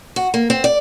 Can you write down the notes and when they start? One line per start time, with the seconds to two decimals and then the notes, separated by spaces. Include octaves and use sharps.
0.16 F#4
0.34 A#3
0.50 C4
0.64 D5